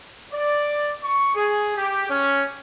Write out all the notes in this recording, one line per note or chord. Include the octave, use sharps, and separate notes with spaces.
D5
C#6
G#4
G4
C#4